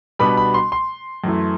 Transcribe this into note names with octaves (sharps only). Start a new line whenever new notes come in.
B2 G3 B3 D4 B5
B5
C6
C6
F#2 E3 A3